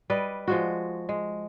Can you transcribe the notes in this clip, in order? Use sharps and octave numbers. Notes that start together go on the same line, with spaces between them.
G3 B4 D5 D#5
F3 G#3 F#4
G#3